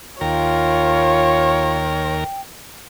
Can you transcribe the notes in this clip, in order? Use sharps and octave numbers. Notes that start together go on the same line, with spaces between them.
D#2 F4 A#4 C#5 G5